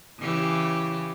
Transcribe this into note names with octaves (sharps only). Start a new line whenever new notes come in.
C#3 E3 G4